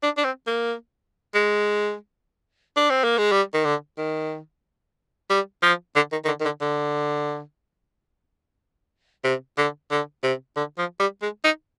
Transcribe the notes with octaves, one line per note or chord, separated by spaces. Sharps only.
D4
D4
C4
A#3
G#3
D4
C4
A#3
G#3
G3
D#3
D3
D#3
G3
F3
D3
D#3
D#3
D3
D#3
D3
D3
C3
D3
D3
C3
D3
F3
G3
G#3
D#4